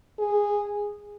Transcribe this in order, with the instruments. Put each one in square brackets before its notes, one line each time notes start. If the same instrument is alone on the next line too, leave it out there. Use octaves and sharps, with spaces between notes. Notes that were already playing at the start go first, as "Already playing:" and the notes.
[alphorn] G#4